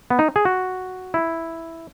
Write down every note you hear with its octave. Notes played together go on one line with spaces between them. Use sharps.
B3
D#4
G#4
F#4
E4